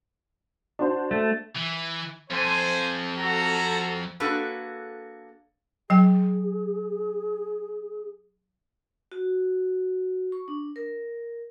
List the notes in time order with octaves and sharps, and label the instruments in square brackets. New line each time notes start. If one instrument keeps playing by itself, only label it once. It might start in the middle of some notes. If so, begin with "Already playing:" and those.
[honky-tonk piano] D4 F#4 C5
[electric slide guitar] A3
[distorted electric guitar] E3
[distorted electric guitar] F2 [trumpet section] C5 G#5
[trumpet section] F#4 A4 A#5
[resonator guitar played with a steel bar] A#3 D4 F#4 G#4 A4 B4
[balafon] F#3 G5 [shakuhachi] G#4
[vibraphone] F#4
C#6
D4
A#4